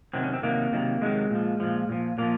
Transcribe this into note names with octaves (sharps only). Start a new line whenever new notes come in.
C3 D#3 F#3 C4
C#4
C4
C3 D#3 F#3 A#3
C3 D#3 F#3
C3 D#3 F#3 G#3
A#2 F3
A#2 F3
A#2 F3
A#2 F3 A#3